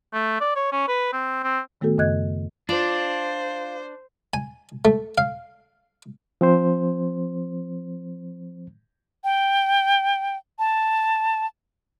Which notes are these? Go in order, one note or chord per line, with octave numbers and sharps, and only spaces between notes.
A3
D5
C#5
C#4
B4
C4
C4
A2 D#3 A3 B3 F#4 A4
F#2 C#3 D#5 F#6 G#6
D4 F4 C5 D5
G#5
A3
F5
F3 C4 C5
G5
A5